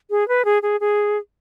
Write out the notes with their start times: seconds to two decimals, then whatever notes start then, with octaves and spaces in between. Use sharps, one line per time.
0.10 G#4
0.28 B4
0.45 G#4
0.63 G#4
0.81 G#4